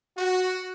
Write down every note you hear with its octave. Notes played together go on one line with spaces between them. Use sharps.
F#4